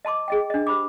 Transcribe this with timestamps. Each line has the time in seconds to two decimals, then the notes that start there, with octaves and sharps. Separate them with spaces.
0.05 D#5 A5 C6 D6
0.28 G#4 D#5 G5
0.50 D4 D#5
0.67 G4 C5 B5 D6